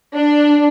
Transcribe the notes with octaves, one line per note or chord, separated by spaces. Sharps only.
D4